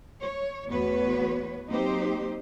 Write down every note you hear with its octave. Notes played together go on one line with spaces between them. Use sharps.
C#5
E2 A3 B3 F#4 B4 C#5
F#3 A#3 C4 D#4 G4 C5